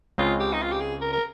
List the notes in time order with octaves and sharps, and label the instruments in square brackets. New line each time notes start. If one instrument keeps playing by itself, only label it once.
[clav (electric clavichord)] C#2 C#3 G#3 C4 [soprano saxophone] F4
[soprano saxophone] G4
D#4
F4
G4
G#4
A#4
A#4